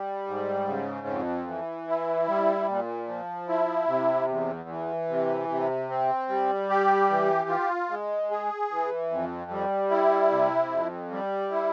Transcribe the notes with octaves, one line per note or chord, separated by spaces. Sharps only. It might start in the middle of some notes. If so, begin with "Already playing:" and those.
Already playing: G3
G#2
C#3
F2
E3
E4
G3
A#2
F3
E4
C3
E2
E3
C3
C3
C4
G3
G4
E3
F4
G#3
G#4
E3
F2
G3
E4
C3
F2
G3
E4